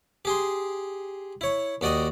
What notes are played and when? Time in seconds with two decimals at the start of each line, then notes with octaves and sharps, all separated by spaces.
0.25 G4 G#4 C6
1.41 E4 C#5
1.81 D#2 F#4 D5 D#5 G5